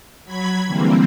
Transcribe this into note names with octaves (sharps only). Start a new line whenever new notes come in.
F#3 B5 G#6
D3 E3 G3 A#3 C4